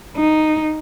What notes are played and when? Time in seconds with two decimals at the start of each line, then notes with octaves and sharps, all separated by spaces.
0.17 D#4